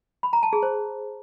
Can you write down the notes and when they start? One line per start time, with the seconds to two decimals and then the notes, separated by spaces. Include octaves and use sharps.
0.23 B5
0.33 A#5
0.43 A5
0.53 G#4
0.63 C5